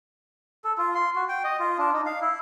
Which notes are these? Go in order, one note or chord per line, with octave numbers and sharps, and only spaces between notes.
A4
F4
C6
F#4
G5
D#5
F4
D4
D#4
F5
E4